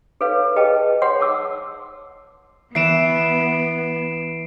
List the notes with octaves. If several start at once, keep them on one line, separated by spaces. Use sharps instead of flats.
A4 B4 C#5 F5
G#4 B4 D#5 G5 A5
C#5 F#5 C6
A5 D6 E6
E3 B3 B4 C7 D7 E7